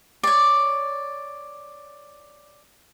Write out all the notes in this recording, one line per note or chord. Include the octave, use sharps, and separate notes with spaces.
C#5 D5